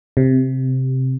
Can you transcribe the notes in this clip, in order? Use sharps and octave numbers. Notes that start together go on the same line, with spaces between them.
C3